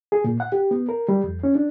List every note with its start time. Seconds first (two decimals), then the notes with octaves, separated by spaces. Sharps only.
0.12 G#4
0.24 A#2
0.40 F#5
0.52 G4
0.71 B3
0.89 A#4
1.08 G3
1.24 F2
1.44 C#4
1.55 D4